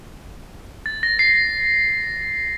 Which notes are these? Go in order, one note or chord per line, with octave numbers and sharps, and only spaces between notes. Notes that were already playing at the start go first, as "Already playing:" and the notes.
A6
A#6
C7